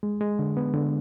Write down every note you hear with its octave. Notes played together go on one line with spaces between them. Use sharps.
G#3
G#3
D3
B3
D3